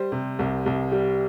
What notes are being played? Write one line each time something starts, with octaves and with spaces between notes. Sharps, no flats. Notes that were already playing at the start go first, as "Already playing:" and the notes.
Already playing: G3 C5
C3
C2
C2
G3